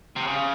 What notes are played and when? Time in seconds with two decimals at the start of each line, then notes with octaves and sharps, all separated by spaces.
0.16 C3
0.27 C#3